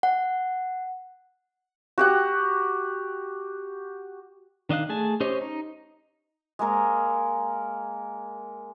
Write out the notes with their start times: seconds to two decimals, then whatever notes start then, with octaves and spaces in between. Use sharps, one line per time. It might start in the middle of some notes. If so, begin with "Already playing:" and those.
0.03 F#5
1.98 F#4 G4 F#5
4.69 D#3 D4 D#5 F5 F#6
4.89 A3 G#4 G#5 A5
5.20 C#4 G4 C5 C#5 D#5
5.41 D#4
6.59 G#3 A#3 A#4 A#5